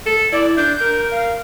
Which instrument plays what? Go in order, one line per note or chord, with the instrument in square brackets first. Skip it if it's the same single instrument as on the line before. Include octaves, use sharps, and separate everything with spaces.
[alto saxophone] A4
[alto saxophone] E4 [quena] D5
[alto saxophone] D4 [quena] G6
[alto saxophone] A#4
[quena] F5